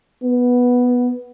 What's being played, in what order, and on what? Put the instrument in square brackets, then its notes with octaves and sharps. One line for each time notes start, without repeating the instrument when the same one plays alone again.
[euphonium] B3